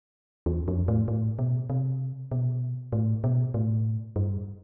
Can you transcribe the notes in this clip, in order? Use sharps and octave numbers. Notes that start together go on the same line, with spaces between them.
E2
F2
A2
A2
B2
C3
B2
A2
B2
A2
G2